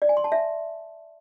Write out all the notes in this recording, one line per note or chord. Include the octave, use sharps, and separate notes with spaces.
D5
G#5
C6
A5
E5